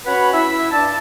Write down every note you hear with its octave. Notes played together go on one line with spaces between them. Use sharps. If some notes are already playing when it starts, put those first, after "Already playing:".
C#4 F#4 B4 C#5 F#5 B5
E4 E5
G2 D5 A5